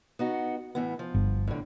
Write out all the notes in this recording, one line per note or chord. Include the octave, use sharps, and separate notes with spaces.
B3 D#4 F#4
A2 E3 B3
F3
G1
A2 D3